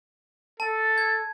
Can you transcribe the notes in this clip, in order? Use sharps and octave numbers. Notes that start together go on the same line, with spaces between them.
A4 A5
G#6